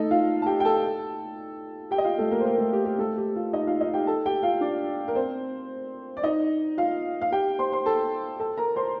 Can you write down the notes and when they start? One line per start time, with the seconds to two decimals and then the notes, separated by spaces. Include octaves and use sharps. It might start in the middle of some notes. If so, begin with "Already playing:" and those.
Already playing: A3 D#4 A4 D#5
0.11 F4 F5
0.42 A5
0.46 G4 G5
0.60 G5
0.65 A4 A5
1.91 G4 G5
1.98 D#5
2.05 F4 F5
2.18 A3 A4
2.31 A#3 A#4
2.40 C5
2.45 A#3 A#4
2.58 A3 A4
2.73 G4
2.85 G4
2.99 A3 A4
3.17 G4
3.36 F4
3.53 D#4 D#5
3.67 F4 F5
3.81 D#4 D#5
3.94 G4 G5
4.07 A4 A5
4.26 G4 G5
4.43 F4 F5
4.61 D4 D5
5.08 A#4
5.15 C4 C5
6.17 D5
6.23 D#4 D#5
6.78 F4 F5
7.22 F5
7.32 G4 G5
7.59 C5 C6
7.72 C5 C6
7.86 A4 A5
8.40 A4 A5
8.58 A#4 A#5
8.76 C5 C6